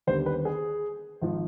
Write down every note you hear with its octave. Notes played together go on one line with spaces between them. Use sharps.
D#2 D3 G3 B3 C5
B4
G#4
G#1 F3